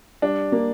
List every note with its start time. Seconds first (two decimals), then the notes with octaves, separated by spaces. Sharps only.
0.22 G3 D4
0.52 A#3